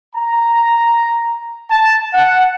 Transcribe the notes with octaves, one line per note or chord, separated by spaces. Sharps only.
A#5
A5
F#5